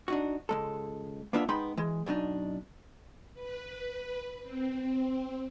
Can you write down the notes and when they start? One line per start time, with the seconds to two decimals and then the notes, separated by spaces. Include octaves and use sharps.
0.08 D4 D#4 F#4
0.49 C#2 G#3 A4
1.33 A#3 B3 D4 F4 D5 E5
1.48 G#3 B3 D#4 G5 B5 C6
1.77 E3 G#3
2.06 F#2 B2 D4 D#4
3.34 B4
4.42 C4